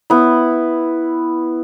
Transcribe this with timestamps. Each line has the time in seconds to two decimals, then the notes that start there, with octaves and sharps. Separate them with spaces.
0.10 B3 E4